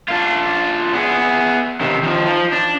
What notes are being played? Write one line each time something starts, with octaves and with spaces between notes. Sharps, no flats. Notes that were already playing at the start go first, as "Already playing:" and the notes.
D4 F4
B3 G#4
C3 D#3
D#3 F3
F3
D4